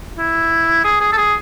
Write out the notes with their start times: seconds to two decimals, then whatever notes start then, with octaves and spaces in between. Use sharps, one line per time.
0.18 E4
0.84 G#4
1.00 G#4
1.12 A4
1.17 G#4